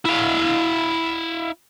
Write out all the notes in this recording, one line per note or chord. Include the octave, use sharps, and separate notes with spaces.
E4 F5